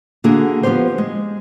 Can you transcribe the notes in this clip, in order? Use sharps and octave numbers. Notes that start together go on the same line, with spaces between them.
D3 A#3 F#4 G#4 E5
F3 B3 C#4 G4 C5
G#3